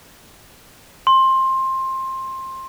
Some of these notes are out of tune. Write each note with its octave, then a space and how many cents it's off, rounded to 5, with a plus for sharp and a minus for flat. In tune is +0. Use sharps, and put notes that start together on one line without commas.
C6 +15